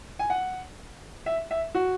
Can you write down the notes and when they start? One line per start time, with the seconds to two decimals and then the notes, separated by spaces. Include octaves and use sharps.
0.19 G#5
0.30 F#5
1.26 E5
1.51 E5
1.75 F#4